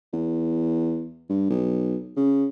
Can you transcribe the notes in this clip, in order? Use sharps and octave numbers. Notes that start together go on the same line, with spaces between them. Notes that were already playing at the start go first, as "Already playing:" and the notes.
E2
G2
B1
C#3